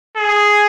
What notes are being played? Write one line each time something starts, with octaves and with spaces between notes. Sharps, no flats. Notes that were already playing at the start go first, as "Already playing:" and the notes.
G#4